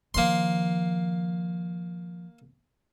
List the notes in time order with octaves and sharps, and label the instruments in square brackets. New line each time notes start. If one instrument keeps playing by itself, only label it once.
[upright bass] D#3 F3 [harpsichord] A#3 C6